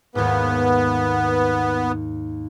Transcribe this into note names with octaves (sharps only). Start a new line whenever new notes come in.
D#2 G#2 B3